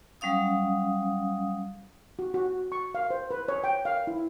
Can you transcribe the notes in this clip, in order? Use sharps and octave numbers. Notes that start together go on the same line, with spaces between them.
F#3 G3 C#4 F5 D#6
F#4
F#4
C#6
F5
C5
B4
C#5
G5
F5
E4